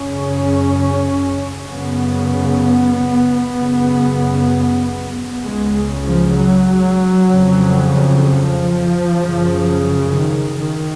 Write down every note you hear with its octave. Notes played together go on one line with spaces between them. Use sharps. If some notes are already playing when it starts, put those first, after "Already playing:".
Already playing: F#2 C#3 C#4
F#2 C#3 B3
F#2 C#3
C#2 C#3 G#3
F3
F#3
F2 C#3
F3
F#2 C#3
D#3
D#3